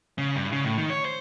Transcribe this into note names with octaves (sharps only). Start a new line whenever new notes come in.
C#3
G2
C#3
A2
D#3
C#5
C5